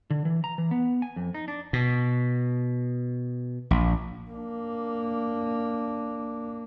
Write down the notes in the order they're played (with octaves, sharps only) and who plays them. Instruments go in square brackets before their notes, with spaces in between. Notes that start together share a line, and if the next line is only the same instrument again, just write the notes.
[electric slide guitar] D3
E3
A#5
E3
B3
G#5
F2
D#4
D4
[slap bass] B2
A#1
[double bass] A#3 D4